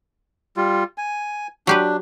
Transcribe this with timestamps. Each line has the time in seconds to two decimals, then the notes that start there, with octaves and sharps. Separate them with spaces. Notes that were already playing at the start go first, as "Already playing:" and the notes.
0.57 G3 F4
0.98 G#5
1.67 F#3 D4 G4 B4